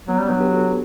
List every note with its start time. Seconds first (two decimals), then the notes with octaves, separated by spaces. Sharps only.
0.08 F#3 B3
0.18 G3 C#4
0.29 F#3 B3 D4
0.40 G4 B4
0.51 F#4 A4